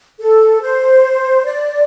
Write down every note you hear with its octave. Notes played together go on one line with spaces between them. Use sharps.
A4
C5
D5